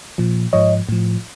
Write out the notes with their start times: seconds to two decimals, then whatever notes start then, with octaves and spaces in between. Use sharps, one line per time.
0.18 A#2 F3
0.53 G#2 F3 C#5 D#5
0.89 A2 F3